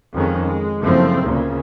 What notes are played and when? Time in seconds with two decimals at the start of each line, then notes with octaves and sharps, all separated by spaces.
0.14 F2 D#3 G#3 C#4
0.45 G#3
0.81 F#1 F#2 F3 A3 A#3 C4
1.23 D2 A#2 C#3